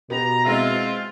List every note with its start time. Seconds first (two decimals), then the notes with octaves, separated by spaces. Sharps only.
0.10 B2 B3 G4 A#5
0.45 G#3 C4 E4 F4 E5